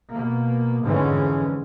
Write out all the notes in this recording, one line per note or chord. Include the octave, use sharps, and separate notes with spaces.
B2 A#3
F2 G#2 D3 E3 G#3 C#4